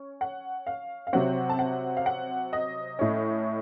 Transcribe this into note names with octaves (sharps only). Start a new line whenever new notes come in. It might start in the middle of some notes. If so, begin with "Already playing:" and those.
Already playing: C#4
F#5
F5
F5
C3 F#3 C4 F#5
A5
F#5
F5
F#5
D#5
A2 A3 C#4